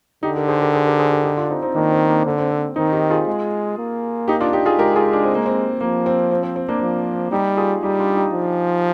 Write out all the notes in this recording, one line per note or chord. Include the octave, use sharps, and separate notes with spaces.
D3 D#4 G4
G4 A#4
G#4 C5
G4 A#4
G#4 C5
G4 A#4
G#4 C5
G4 A#4
D#4 G4
D4 F4
C4 D#4
C4 D#4
D#3 A#3 D4
C4
A#3 D4
D3 C4
C4
C4
D#3 C4 D#4
D#4 G4
F4 G#4
G#3
A#3
D#4 G4
D4 F4
D#4 G4
F4 G#4
G#3 G4 A#4
F4 G#4
D4
C4
A#3
C4
F3 A#3
C4
C4
C4
C4
A#3 D4
F3
G3 D#4 G4
F4 G#4
G3 D#4 G4
D4 F4
D#4 G4
F3